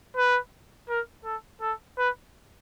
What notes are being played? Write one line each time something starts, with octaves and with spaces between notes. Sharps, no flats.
B4
A#4
A4
A4
B4